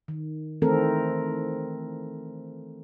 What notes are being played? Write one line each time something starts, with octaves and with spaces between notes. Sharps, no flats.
D#3
D#3 E3 A3 C4 A4 A#4